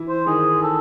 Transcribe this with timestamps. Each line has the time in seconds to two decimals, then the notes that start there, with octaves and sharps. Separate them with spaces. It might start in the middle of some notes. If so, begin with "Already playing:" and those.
Already playing: E3 E4
0.09 C5
0.27 D#3 D#4 G#4
0.63 A4